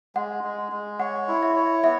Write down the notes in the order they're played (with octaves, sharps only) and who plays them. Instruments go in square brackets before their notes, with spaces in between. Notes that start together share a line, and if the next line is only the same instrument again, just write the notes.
[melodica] G#3 [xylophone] F#5
[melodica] G#3
G#3
[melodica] C#5 [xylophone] F#5
[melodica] E4
[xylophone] E5
[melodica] C#5
[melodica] B3 [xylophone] E5